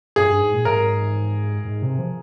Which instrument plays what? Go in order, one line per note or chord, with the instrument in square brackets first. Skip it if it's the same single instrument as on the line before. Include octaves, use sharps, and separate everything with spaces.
[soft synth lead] G2 [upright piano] G#4
[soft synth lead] G2
G#2
A#2
[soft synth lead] G#2 [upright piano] A#4
[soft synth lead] G#2
C3
F3